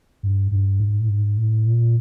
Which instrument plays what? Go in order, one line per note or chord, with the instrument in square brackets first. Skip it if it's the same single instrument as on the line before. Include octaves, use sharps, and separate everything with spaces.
[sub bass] G2
G2
G#2
A2
G#2
A2
A#2